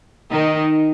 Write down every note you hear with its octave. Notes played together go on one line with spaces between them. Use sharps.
D#3 D#4